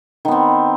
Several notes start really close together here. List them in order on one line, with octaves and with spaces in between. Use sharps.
D#3 B3 C4